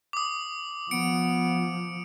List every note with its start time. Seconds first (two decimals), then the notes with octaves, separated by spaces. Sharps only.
0.13 D6 D#6
0.91 F3 B3 C#7 D7